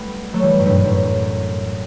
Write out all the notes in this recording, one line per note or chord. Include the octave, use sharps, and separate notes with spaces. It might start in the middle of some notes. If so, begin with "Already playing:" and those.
Already playing: G3 A3 B3
F#3 A3
E3 G3
F#2 A2
G2 B2
F#2 A2